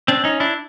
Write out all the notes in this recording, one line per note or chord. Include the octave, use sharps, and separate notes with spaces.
C4 D4
C#4 D#4
D4 E4